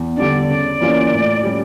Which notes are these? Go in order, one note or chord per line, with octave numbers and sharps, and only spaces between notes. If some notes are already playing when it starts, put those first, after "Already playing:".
Already playing: E2
D3 G3 D4 D5
C#3 D5
E3 A#3 C#4 F4
A2
G3 C#4 G4